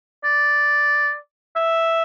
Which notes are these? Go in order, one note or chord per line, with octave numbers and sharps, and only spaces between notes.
D5
E5